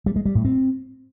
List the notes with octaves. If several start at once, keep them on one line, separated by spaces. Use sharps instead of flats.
G3
G#3
G3
A2
C4